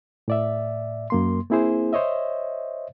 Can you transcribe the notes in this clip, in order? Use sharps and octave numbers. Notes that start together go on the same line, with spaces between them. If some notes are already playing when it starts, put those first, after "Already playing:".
A2 D5 E5
F#2 A#3 C6
A#3 C4 E4 G#4 C5
C5 C#5 D#5 E5